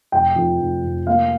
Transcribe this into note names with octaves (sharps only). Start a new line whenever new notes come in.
F1 G5
F2
F1
F1
A#3 F5